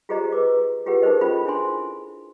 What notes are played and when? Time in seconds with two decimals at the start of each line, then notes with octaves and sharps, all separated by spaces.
0.09 F4 G4 G#4 C5 D#5 A#5
0.32 B4 D6
0.86 F4 G4 G#4 B4 F#5
1.02 D#4 G#4 A#4 C5 D#5
1.21 C#4 F4 A4 B5
1.45 D4 E4 G#4 C5 G#5 C6